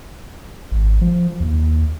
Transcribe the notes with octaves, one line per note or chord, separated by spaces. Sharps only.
G#1
F3
D#2